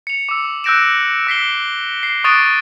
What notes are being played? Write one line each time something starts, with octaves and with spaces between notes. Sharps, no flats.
C#7 F7
D6 E6
E6 F#6 G6 A#6 D7 E7
E6 B6 C7 G7
C7
C#6 D#6 F#6 A6 D7 E7